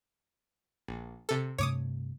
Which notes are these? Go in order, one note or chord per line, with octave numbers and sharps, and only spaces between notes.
A#1
C3 A4
G2 C3 A3 C#5 D6 D#6